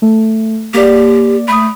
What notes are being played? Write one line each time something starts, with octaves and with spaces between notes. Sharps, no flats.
A3
A#3 G4 D5
A3 B5 D#6